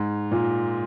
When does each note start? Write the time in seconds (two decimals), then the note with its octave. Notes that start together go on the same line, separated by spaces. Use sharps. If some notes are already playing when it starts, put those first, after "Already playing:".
Already playing: G#2
0.32 A#2